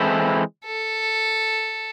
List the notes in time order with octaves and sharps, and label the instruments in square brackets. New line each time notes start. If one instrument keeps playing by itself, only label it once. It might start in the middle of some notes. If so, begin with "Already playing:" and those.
Already playing: [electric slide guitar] E3 G#3 C4 E4 A4
[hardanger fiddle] A4